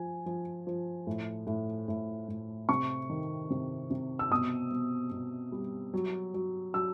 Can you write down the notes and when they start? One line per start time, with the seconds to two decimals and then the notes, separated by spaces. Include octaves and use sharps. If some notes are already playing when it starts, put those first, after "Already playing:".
Already playing: F3 G#5
0.26 F3
0.67 F3
1.07 A2
1.47 A2
1.88 A2
2.28 A2
2.69 C3 C#6
3.09 D#3
3.50 C3
3.91 C3
4.19 E6
4.31 B2 D#6
4.71 B2
5.11 B2
5.52 G3
5.93 F#3
6.34 F#3
6.74 F#3 E6